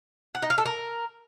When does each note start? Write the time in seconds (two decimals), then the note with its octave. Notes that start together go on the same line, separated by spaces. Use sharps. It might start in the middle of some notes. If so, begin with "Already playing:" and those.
0.35 F#5
0.42 D#4
0.50 F5
0.58 A4
0.65 A#4